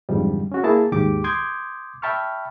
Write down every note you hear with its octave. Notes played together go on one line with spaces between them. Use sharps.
F2 G#2 D3 E3 F3 G3
C#4 F#4
A#3 E4 G#4 A5
D#2 G#2 G4 D6
C6 D6 D#6 G6 G#6
E5 G5 A5 B5 C#6 F6